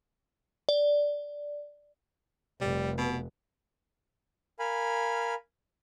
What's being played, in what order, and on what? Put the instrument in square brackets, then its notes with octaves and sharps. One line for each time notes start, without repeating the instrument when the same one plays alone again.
[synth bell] D5
[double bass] F1 [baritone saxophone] G3
[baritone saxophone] B2
[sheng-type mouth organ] A#4 F5 G#5 B5